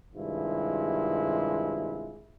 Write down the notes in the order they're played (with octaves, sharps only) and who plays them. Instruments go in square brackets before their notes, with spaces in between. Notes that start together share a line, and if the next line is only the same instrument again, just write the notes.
[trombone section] G2 C3 D#3 G#3 E4 F4